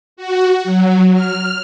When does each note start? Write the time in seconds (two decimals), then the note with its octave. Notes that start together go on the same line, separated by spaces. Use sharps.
0.17 F#4
0.64 F#3
1.13 F6